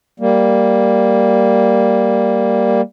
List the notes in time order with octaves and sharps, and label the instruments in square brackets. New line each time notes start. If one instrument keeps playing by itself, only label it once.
[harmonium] G3 A#3